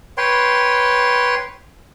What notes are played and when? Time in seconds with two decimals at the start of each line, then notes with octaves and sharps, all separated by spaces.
0.18 B4 C#5 G5 C6